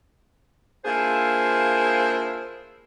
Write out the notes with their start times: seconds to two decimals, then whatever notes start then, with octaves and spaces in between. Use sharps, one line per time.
0.85 A#3 D4 E4 F4 G#4 C5